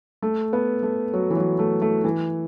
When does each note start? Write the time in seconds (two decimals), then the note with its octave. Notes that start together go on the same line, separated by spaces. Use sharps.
0.22 A3
0.53 B3
0.83 A3
1.13 F#3
1.30 E3
1.36 F#3
1.59 A3
1.82 A3
2.04 E3